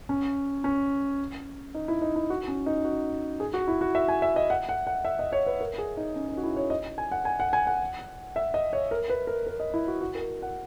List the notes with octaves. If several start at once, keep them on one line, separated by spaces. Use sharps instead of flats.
C#4
C#4
D#4
E4
D#4
E4
F#4
C#4
D#4
F#4
G#4
F#4
E4
F#4
E5
G#5
E5
D#5
F#5
F#5
F#5
E5
D#5
C#5
B4
A#4
G#4
D#4
C#4
D#4
F#4
E4
C#5
D#5
G#5
F#5
G#5
F#5
G#5
F#5
E5
D#5
C#5
A#4
B4
A#4
A#4
D#5
E4
F#4
F#4
A#4
F#5